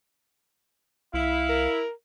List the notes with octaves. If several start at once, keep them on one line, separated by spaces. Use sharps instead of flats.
C2 E4 F5
A#4